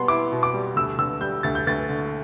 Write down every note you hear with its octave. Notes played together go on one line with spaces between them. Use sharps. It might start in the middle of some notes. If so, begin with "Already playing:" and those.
Already playing: B2 G3 B3 C6
E4 D6
B2
D6
G3
D2 E6
D3 E6
G3 G6
D2 A6
G6
D2 A6
D3